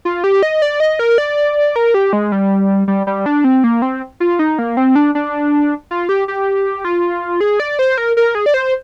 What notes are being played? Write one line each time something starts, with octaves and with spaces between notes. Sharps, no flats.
F4
G4
D#5
D5
D#5
A#4
D5
A#4
G4
G#3
G3
G3
G3
D4
C4
A#3
C4
F4
D#4
A#3
C4
D4
D4
F4
G4
G4
F4
G#4
D5
C5
A#4
A#4
G#4
D5
C5